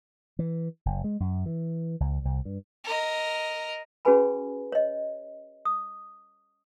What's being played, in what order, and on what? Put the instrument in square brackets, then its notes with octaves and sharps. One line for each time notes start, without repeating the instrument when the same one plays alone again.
[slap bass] E3
F#1
G#3
F#2
E3
C#2
C2
G2
[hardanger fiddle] A#4 D#5
[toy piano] C#4 F#4 G#4 B4 G#5 B5
C#5 D#5
D#6